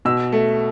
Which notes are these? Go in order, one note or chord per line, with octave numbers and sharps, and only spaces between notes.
B2 E6
A3